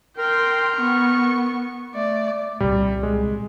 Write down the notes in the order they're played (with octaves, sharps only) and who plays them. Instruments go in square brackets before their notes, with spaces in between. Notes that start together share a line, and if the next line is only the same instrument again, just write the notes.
[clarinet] A#4 [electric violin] G5 C6
[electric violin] B3 C#6
[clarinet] A3 [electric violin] D5
[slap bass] C2 A#2 [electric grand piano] G3
[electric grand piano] G#3